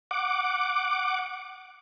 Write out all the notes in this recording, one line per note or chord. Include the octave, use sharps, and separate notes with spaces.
F#5 D6